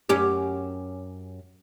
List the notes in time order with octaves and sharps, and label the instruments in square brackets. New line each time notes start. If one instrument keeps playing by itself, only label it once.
[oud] F#2 C#4 G4